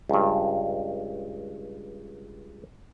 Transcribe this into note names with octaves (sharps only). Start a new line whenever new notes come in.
C#2 G2